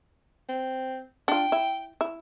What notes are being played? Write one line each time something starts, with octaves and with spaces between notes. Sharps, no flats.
C4
D4 F4 G5
E4
E4